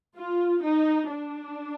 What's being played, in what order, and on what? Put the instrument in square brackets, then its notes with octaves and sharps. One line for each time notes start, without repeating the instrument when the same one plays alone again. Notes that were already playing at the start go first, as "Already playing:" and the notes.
[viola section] F4
D#4
D4